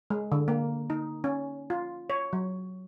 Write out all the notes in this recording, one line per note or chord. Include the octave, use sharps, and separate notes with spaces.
G#3
D3
A#3
D#4
C#4
F4
C#5
F#3